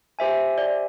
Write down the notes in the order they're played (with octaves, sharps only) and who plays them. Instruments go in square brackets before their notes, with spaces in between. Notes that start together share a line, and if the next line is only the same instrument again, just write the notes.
[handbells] G4 C5 E5 G#5
[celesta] D5